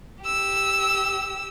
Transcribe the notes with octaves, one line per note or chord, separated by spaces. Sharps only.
G4 E6